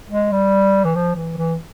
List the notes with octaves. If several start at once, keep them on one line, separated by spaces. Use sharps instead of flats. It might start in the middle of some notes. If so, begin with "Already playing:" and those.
G#3
G3
E3
F3
E3
E3